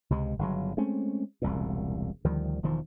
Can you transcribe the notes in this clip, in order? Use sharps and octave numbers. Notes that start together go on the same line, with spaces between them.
C#2 C3 G#3
G1 C#3 F#3
G#3 A3 C4 C#4
E1 C2 A#2
D2 D#3 F3 G3
E1 E2 D#3 F3